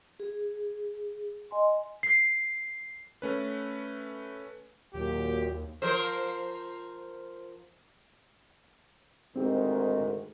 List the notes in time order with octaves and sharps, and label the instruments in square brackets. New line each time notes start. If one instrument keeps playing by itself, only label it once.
[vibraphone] G#4
D#5 G#5 C6
[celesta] C7
[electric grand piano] A3 C#4 B4
[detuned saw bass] D#2 [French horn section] A#2 F#3 [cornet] G4
[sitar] F3 A#4 C5
[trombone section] D2 G#2 D#3 [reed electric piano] C4 G4